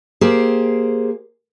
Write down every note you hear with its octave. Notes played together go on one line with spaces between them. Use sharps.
A#3 G4 G#4 C5